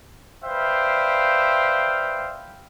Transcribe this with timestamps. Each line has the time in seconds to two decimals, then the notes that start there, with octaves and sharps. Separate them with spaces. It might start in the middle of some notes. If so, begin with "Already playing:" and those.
0.45 B4 C5 D5 E5 F5 G5